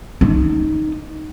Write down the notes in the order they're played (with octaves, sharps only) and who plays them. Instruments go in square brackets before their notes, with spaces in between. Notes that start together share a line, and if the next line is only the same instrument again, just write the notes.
[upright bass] D#4